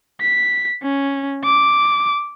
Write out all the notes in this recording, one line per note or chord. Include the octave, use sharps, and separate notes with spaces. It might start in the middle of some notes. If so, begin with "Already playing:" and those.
B6
C#4
D6